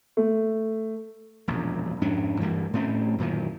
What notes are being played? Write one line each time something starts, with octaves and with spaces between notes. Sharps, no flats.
A3
E1 A#1 F#2
F2 G#2 C#4 D4
D2 G2 E3 A#3
A2 A3 C4 C#4
F#2 A#2 D#3 E3